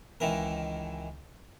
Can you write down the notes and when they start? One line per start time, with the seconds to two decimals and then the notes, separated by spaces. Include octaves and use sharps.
0.20 C#2 D#3 E3 A#4